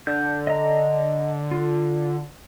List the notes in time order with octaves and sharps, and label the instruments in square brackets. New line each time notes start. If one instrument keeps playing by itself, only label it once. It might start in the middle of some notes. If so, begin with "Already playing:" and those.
[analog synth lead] D3 [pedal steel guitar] G6
[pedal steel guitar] D#5 A#5
F4